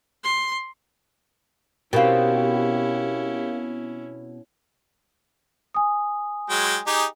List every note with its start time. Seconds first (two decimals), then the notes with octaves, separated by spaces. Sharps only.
0.24 C6
1.93 B2 C4 C#4 E4 G4 A#4 F5
5.74 G#5 D#6
6.50 F#3 G#3 G5
6.87 D#4 G4 G#4